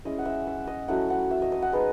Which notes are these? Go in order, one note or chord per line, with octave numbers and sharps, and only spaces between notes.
G#3 C#4 E4 D#5
F#5
E5
E5
D#5
F#3 A3 C#4 E4 F#5
F#5
E5
D#5
D#5
F#5
G#3 B3 D#4